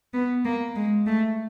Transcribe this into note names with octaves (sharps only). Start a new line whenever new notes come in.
B3
A#3
G#3
A3